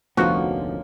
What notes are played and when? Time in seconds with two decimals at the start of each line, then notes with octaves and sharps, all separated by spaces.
0.17 F1 D2 F3 A#3 B3 C#4 D#4 F#4